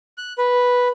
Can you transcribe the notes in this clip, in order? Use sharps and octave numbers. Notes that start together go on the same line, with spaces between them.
F#6
B4